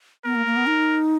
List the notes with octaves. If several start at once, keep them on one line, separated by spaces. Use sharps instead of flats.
B3 A#4
A#3
A#3
B3
D#4